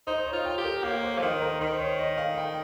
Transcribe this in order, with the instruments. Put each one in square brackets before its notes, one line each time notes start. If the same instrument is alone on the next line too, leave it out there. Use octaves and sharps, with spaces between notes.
[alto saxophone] D#4 [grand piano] C5
[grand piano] C#5
[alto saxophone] F4
[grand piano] G5
[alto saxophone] G4
[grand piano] A#4
[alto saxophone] A#3 [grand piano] C#5
[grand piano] C5
[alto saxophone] F3
[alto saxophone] D#3 [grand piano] C5
[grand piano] C5
A#4
[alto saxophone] D#3 [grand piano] C5
[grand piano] C#5
D#5
F5
G5